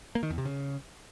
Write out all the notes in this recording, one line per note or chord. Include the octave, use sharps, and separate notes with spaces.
A#3
D#3
E2
C3
C#3